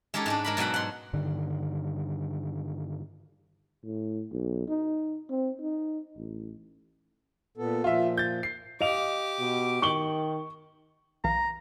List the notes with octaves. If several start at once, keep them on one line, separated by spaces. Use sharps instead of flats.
G#3 C#4 D#4 G4 A4
G#2 G#3 D4
G#3 A#4 B5
G#2 B2 F#3 F#5 B5
F#5 C6
G2 D3 D#3
A2
B1
D#4
C4
D#4
A1
A#2 B3 A4
A#2 F3 F4 E5
G6 A6
C7
G4 D#5 F5 D6 F7
B2
D#3 C#6 F#7 G7
B1 E3 F5 A#5